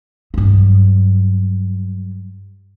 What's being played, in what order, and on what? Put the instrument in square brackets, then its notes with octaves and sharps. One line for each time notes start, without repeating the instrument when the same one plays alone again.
[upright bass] G2 F#3